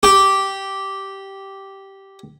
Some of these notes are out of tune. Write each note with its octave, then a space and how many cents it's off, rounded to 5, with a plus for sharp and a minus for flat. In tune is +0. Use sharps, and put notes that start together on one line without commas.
G4 -10